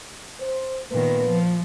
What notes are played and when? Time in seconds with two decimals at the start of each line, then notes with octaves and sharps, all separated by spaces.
0.40 C5
0.92 A#2 D#3 B3 B4
1.26 F3